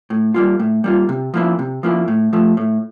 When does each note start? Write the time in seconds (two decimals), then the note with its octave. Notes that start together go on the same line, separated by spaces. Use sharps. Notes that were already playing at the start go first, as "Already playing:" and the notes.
0.10 A2
0.34 G3 A#3 F4
0.60 A2
0.84 G3 A#3 F4
1.09 C3
1.34 F3 A#3 E4
1.59 C3
1.83 F3 A#3 E4
2.08 A2
2.33 F3 A3
2.57 A2